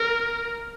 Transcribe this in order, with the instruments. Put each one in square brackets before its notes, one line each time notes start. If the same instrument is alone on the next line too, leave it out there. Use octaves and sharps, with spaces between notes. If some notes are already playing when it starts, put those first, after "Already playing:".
Already playing: [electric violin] A#4